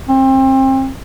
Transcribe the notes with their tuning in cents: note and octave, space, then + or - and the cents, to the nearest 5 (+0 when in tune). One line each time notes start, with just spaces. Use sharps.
C4 +30